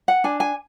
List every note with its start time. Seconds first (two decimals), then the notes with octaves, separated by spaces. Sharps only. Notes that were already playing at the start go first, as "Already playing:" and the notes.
0.08 F#5
0.24 D4 G#5
0.40 G#5